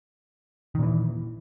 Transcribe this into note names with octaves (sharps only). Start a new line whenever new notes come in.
A#2 D#3 E3